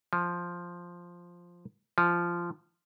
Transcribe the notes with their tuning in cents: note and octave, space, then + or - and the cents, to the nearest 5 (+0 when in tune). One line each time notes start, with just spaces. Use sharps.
F3 +0
F3 -15